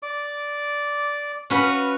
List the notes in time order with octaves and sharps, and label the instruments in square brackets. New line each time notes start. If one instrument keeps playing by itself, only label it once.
[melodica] D5 D6
[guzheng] C#4 F#4 B4 [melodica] F5